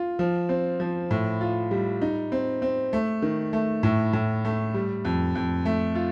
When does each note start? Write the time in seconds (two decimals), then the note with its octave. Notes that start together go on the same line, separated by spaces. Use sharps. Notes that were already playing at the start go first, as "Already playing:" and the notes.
Already playing: F4
0.19 F3
0.49 C4
0.80 F3
1.11 A2
1.41 F4
1.71 G3
2.02 D#4
2.32 C4
2.62 C4
2.93 A3
3.22 D#3
3.53 A3
3.83 A2
4.13 A2
4.45 A3
4.74 G3
5.05 F2
5.35 F2
5.66 A3
5.95 F4